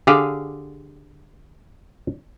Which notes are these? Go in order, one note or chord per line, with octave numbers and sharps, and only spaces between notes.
D3 G4 G#4 F5